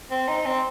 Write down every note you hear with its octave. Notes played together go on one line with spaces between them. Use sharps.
C4
D#4
C4